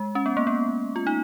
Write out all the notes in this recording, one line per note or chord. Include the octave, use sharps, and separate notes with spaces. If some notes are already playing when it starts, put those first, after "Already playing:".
Already playing: G#3
C#4
B3
A#3
B3
F4
D#4